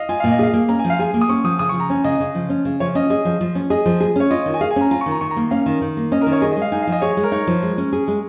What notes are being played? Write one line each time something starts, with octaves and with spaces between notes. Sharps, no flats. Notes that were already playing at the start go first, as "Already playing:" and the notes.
Already playing: D#5 F5
F4 G#5
A#2 F5
D#5
G#4 F5
A#3
C#4 A#5
G#5
F3
F5
G#4 G#5
A#3
D#6
C#4 C#6
F3 D#6
C#3 D#6
C#6
F3
A#5
C#4 G#5
C#3 D#5
C#3
F3
C#4
C#3
F3 C#5
C#4 D#5
G#4 D#5
F3
F3
C#4
G#4 D#5
F3
G#4
C#4 C#5
F4 D#5
D#3
G#5
G#4 F5
G#5
C#4 A#5
F4 A#5
C#6
D#3
A#5
D#3 C#6
A#5
A#3
C#4 F5
D#3
D#3
A#3
C#4 D#5
A#4
D#3
C#5
G#4 D#5
D#5
G#3
F5
D#4 G#5
F5
F3 D#5
G#4 C#5
G#3
A#4
D#4 C#5
F3
G#3
C#4
G#4
G#3